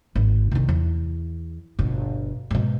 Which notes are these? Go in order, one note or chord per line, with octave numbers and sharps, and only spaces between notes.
G#1
C2 D#3
E2
G1 B2
G#2 B2